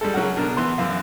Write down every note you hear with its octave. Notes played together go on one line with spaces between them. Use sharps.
G3 G#3 A4
C#3 F#3 F#4 A#4 F#5
B2 D4 A#4
E3 B3 C6
F#2 E3 F5